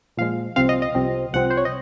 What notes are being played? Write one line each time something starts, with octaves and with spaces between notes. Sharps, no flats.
A#2 F3 G#3 F5
C2 C3 F3 C4 F5
D#5
D#5
C2 C3 F3 C4
C2 C3 F3 C4 F#5
C5
C#5
D#5